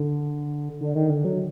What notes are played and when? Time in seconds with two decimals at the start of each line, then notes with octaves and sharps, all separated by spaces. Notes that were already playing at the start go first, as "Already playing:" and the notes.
Already playing: D3
0.81 D3
0.95 D#3
1.10 D3
1.25 F#3